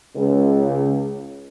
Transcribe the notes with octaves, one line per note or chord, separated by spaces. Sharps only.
C#2